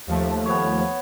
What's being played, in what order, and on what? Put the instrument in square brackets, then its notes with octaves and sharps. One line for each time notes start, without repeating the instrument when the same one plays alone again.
[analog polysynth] D#2 F3 A3
[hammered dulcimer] B3 C#5